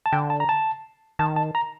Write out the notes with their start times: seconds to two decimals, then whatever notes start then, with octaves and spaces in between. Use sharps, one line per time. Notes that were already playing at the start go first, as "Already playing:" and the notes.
0.06 A5
0.12 D3 G5
0.30 A5
0.40 A#5
0.49 A5
1.19 D#3 A5
1.36 A5
1.55 A#5